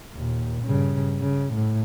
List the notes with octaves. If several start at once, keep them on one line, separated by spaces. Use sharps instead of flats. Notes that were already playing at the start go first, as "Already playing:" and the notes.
D#2 A#2
G2 C#3
C#3
A2